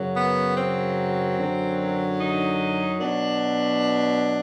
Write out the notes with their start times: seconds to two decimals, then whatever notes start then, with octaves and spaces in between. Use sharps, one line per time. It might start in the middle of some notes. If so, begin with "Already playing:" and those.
Already playing: F#2 C#3 F#3
0.16 B3
0.57 C4
1.38 F#2 D3 F#3
2.19 D#4
2.99 B2 F#3 D4